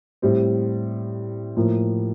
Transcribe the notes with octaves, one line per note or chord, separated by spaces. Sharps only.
A2 G3 C4
A2 F3 A#3